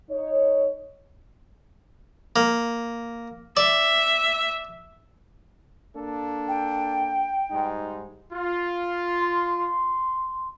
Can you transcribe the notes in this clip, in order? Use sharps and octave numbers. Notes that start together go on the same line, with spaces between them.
D#4 C#5
A#3
D5 E5
A#3 D4 A4
G5
G#2 G3 D#4
F4
C6